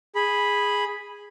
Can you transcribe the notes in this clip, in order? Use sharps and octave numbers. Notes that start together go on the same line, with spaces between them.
G#4 B5